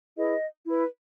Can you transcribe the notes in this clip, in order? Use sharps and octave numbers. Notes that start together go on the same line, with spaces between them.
E4 G#4 B4 D#5
E4 B4